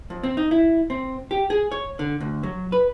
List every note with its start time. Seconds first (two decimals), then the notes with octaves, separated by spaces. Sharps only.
0.10 F2
0.23 C4
0.37 D#4
0.51 E4
0.90 C4
1.31 G4
1.50 G#4
1.72 C#5
1.99 D3
2.20 D2
2.43 F#3
2.72 B4